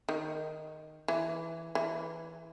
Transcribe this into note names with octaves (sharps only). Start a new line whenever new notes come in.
D#3
E3
E3